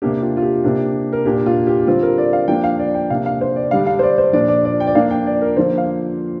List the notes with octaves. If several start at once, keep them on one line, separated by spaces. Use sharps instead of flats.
C3 A#3 D4 G4
F4
F4
G4
C3 A#3 D4
A#4
A#2 A#3 D4 G4
F4
G4
D3 G3 C4 F4
A#4
D5
F5
F3 A#3 D4 G5
F5
D5
G5
C3 A#3 D4 F5
F5
C5
D5
D3 G3 D4 F5
F5
C5
D5
C5
A#2 F3 D4 D5
D5
D5
G5
D5
F3 A#3 D4 F5
G5
D5
A#4
D3 F3 A#3 C5
F5